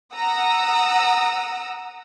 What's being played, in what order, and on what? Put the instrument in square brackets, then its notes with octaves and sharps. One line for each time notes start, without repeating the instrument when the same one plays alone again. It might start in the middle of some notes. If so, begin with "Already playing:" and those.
[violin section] F#5 A#5 D#6 E6